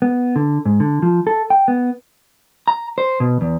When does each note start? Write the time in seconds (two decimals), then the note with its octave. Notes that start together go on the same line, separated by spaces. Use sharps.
0.02 B3
0.36 D3
0.66 G#2
0.80 D3
1.02 F3
1.27 A4
1.50 G5
1.68 B3
2.68 A#5
2.98 C5
3.20 B2
3.41 E2